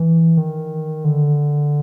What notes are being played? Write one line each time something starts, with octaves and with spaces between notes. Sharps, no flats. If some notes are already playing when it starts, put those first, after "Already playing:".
Already playing: E3
D#3
D3